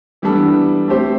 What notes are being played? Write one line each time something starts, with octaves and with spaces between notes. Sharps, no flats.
E3 G3 B3 D4 A4
A3 C4 G4 C5